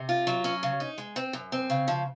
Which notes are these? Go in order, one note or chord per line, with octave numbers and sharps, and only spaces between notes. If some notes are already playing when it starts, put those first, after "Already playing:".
Already playing: C3
F4
F#3
C#4
C#3
D#4
G#3
C4
F#2
C4
C#3
F3